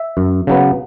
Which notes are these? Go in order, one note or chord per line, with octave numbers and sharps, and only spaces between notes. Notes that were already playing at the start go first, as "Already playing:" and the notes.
Already playing: E5
F#2
C#3 F#3 B3